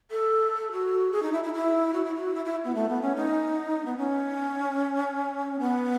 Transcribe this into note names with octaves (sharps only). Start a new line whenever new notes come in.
A4
F#4
G#4
D#4
E4
E4
E4
F#4
E4
F#4
E4
E4
B3
A3
B3
C#4
D#4
B3
C#4
B3